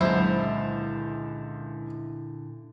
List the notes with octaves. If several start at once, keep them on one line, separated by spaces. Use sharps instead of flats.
C#2 A#2 D3 F#3 E4 C5